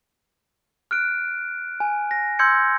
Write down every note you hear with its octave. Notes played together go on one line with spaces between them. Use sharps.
F6 F#6 D7
G#5
A#6
C6 E6 G6 G#6 C#7